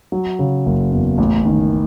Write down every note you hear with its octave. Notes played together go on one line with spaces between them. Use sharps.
F#3
C#3
F#1
E2
A1
D#3